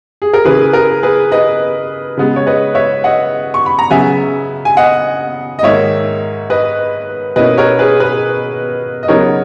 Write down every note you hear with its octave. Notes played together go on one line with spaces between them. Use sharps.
G#4
A#4
C#3 E3 A#3 E4 G#4 B4
A#4
G#4 B4
B4 D#5
C#3 G#3 B3
C#5
B4 D#5
C#5 E5
D#5 F#5
C#6
B5
A#5
C#3 F#3 B3 E5 G#5
G#5
D#5 F#5
D#5
G#2 D#3 A#3 C#5 E5
B4 D#5
B2 A#3 C#4 E4 B4 D#5
A#4 C#5
G#4 B4
G#4 B4
D#5
C#3 F#3 B3 D#4 A#4 C#5